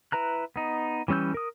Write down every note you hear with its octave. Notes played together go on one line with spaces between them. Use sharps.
E4 B4 A#5 F#6
B3 D#4
E3 G3 C#4 E6 G6
A#4 D#6